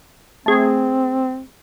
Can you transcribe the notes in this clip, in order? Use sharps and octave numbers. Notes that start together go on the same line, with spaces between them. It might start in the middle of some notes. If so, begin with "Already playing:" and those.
A3 C4 G#4